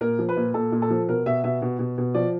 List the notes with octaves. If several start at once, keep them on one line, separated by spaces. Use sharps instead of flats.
A#2 A#4
F3
B4
A#2
A#2 A4
A#2
A4
F3
B2 A#4
B2 E5
B2 E5
B2
B2
B2
F3 D5